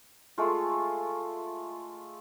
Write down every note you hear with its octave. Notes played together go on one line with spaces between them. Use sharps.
G#3 A3 F4